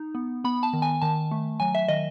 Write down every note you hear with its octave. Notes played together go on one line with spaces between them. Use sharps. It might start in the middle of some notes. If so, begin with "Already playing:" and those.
Already playing: D#4
B3
B3 B5
A5
D#3
G#5
D#3 A5
A3
F#3 G#5
E5
D#3 D#5